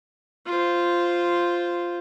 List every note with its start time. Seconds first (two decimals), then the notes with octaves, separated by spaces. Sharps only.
0.46 F4 C5